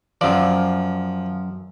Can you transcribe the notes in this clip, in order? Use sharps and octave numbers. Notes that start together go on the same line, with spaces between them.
F#2 F3 D5